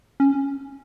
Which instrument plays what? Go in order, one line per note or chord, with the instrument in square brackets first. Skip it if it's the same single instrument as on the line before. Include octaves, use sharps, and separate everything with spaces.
[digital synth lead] C#4